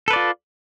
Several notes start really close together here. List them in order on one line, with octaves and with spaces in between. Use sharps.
A4 B4 D5 F4